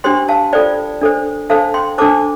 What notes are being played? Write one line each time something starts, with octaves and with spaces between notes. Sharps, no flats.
D4 G4 C5 G5 C6
F5 A5
F4 A4 C5 D5 G5
D4 A4 C5
D4 A4 C5 F5 A5
G5 C6
D4 A4 C5 A5 D6